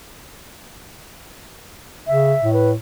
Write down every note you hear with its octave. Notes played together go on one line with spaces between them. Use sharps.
C#3 E5
A2
B4